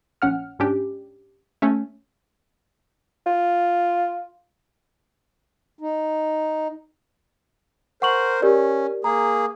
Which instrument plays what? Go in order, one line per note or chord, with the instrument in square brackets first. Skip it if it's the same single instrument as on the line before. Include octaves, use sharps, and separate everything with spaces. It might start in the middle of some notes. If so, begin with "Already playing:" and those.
[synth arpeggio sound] A#1 C#4 F#5 F6
G#2 C#4 D4 G4
A3 C#4
[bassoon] F4
[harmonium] D#4
[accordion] A#4 C5 [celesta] F#5 C#6 F#7
[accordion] C#4 [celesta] G4 A#4 D5
[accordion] A#3 G#4 [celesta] A#5